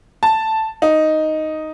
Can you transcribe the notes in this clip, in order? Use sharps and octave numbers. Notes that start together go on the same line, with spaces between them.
A5
D#4